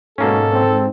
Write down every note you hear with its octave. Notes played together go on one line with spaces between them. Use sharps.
G#2 B2 A#3 C#4 A4
C4